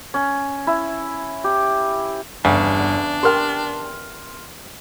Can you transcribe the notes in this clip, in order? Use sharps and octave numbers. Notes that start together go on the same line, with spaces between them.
C#4
E4
G4
G1 E2 C#3 D4
G4 A#4 G5 C6 F6